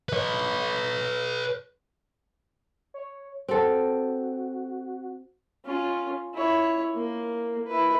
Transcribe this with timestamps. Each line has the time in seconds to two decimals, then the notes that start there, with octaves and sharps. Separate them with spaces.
0.09 B4 C#5
2.94 C#5
3.48 C4 F#4 A4
5.66 C#4 F4
6.34 E4 C#5
6.95 A#3
7.67 E4 B4